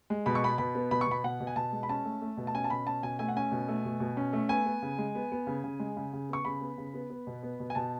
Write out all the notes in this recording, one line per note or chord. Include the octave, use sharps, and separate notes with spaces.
G#3
B2 B5
C#6
B3 B5
B2 B5
B3
B2 B5
C#6
B2 B5
B2 F#5
B2
G#5
B2 A5
G#3
B5
C#4 A5
A3
A3
B2
A5
C#4 G#5
A5
B2 B5
C#4 A5
B2 G#5
A3 G#5
F#5
C#4 G#5
B2
A3
B2
B2
C#4
A3
B3 G#5
B3
C#3
G#3
B3
B3
C#3
C#3
G#3
C#3
C#3
B3 C#6
C#3 B5
B3
C#3
B3
B3
B2
B3
B2
G#5
B2 A5